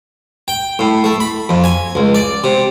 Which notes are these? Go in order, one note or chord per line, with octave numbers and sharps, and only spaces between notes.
G5
A2
A3
B5
F2
G#5
C#2
D5
C3